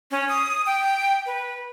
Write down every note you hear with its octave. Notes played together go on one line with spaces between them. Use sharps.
C#4
D#6
G5
B4